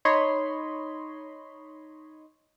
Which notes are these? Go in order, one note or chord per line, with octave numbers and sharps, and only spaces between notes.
D#4 C#5 D#5 B5 C6